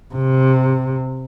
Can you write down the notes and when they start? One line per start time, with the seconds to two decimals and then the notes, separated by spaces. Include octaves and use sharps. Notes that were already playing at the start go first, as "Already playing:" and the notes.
0.15 C3